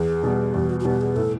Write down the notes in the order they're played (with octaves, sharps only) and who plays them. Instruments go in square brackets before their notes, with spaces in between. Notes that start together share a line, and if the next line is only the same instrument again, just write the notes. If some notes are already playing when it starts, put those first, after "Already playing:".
Already playing: [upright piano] E2 [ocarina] G#4
[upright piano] B2 G3 B3
[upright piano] E2 [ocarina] G4
[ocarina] F#4
F#4
[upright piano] B2 G3 B3 [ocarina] G4
[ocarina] G#4
[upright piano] A2 [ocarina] A4